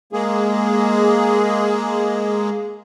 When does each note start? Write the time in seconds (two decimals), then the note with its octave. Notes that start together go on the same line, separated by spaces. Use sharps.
0.13 G#3 A#3 G#4